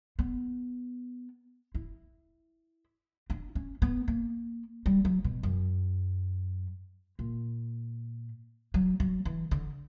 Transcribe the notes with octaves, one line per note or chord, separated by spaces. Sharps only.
B3
E4
D4
C#4
B3
A#3
G3
F#3
B2
F#2
A#2
F#3
F#3
E3
D3